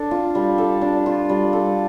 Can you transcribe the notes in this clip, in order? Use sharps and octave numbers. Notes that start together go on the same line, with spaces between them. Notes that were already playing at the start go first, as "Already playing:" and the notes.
Already playing: D4 A4
F4
G3
A4
D4
F4
G3
A4